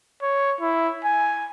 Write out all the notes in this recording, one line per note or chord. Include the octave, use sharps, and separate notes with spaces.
C#5
E4
G#5